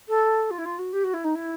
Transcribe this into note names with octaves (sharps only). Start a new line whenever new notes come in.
A4
F4
E4
F4
F#4
G4
F#4
E4
D#4
E4